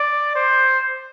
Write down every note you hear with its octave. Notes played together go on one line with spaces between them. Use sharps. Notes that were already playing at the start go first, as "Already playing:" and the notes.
Already playing: D5
C5